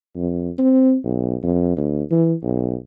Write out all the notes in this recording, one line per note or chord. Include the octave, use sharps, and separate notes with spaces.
F2
C4
B1
F2
D2
E3
B1